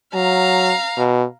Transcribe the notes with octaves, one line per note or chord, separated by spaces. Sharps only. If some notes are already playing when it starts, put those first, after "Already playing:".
F#3 F5 A#5
B2